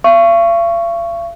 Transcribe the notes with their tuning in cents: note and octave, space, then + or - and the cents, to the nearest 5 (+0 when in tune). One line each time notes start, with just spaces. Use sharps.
F5 -45 C#6 +0